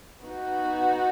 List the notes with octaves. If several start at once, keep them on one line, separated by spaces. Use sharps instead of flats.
B3 D#4 F#4